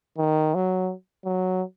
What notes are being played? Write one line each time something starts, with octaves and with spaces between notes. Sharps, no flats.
D#3
F#3
F#3